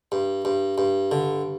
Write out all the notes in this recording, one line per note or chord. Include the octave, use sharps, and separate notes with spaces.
G2
G2
G2
D3